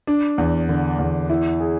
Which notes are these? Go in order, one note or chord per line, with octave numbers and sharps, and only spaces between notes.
D4
E2
D3
E2
E4
G#4